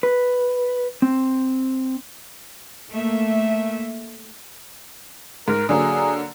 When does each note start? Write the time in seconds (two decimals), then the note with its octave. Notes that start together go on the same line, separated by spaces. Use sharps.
0.03 B4
1.02 C4
2.90 A3 A#3 E5
5.48 G#2 A#4
5.69 D3 F#3 A#3 G#4